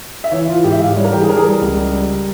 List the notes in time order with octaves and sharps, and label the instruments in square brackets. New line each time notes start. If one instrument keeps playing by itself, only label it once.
[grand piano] E5
E3 C#5
E3 F4
G#2 G4
E5
G#2 F5
G3 C#5
A#4
E3 G4
G#4
E3 A#4
G#4
G3 A#4
C#2
G3
G3